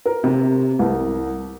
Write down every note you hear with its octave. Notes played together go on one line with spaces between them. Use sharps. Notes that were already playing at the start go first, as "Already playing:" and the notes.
A#4
C3
C2